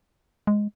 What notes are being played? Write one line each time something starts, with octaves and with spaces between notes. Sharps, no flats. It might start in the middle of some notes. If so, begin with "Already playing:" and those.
G#3